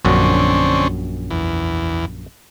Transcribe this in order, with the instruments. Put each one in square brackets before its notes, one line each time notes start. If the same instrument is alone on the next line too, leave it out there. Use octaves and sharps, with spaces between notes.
[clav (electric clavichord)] A#1 F#2 F#4 [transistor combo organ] D3 C4 C#4
[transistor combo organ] E2